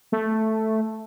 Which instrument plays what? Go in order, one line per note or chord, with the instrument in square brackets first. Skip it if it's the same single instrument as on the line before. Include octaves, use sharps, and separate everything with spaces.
[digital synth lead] A3